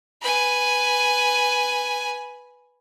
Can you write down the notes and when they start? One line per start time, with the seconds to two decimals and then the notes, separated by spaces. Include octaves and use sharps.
0.22 B4 G#5